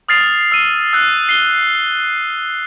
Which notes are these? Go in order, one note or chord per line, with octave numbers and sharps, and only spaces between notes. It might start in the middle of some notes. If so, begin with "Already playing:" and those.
D#6 F6 A6 C7 F7
E6 D#7
E6 F#6 A6
C7 G7